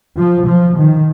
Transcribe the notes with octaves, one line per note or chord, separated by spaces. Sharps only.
F3
F3
D#3